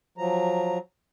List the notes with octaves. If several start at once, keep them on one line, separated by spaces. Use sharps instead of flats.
F3 F#3 A#5